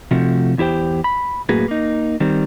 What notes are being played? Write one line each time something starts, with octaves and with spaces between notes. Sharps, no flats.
C3 F3 A3 F#4
E2 E4 G4 C5 G5
B5
F#2 A2 A#3 F#4 G#4 B4
A#3 D#4
D#3 G3 C4